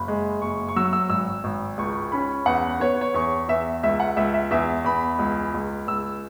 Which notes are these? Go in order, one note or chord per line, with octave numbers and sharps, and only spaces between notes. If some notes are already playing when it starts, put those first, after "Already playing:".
Already playing: F#1 B5
G#3
F#1 C#6
C#6
F#3 E6
E6
G#1 E6
G#1
C#2 C#6
C#4 B5
E2 F#5
B3 C#5
C#5
E2 C#6
E2 E5
C#2 E5
F#5
C#2 E5
E5
E2 E5
E2 B5
C#2
C#2
C#2 E6